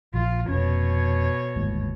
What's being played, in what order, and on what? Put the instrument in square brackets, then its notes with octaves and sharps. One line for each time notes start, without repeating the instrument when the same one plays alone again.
[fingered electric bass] A#1 F3 [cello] F4
[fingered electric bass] F1 C#4 [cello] B2 C#5
[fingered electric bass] G1 D#2 G#2